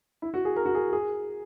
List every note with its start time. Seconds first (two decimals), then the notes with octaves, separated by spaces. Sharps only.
0.22 E4
0.34 F#4
0.45 G#4
0.56 A#4
0.66 F#4
0.75 G#4
0.93 G#4